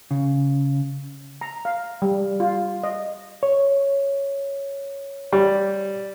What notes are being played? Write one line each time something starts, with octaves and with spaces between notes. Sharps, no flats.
C#3
A#5
F5
G3
F4
D#5
C#5
G3